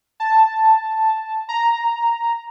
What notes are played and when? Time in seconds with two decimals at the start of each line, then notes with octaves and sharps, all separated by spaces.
0.20 A5
1.49 A#5